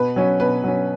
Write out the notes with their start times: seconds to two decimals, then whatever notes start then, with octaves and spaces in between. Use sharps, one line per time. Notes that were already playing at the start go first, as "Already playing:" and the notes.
Already playing: B2 B4
0.16 F#3 C#4
0.40 B2 B4
0.64 F#3 C#4